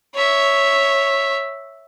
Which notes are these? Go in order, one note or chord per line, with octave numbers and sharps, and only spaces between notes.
C#5 E5